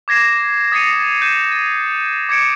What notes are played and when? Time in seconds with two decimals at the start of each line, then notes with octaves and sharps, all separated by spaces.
0.08 D6 G#6 A#6 C7 E7
0.72 D#6 A6 A#6 C7 C#7 D#7
1.22 G6 D#7 E7
1.52 A6
2.29 D6 G#6 C#7 D7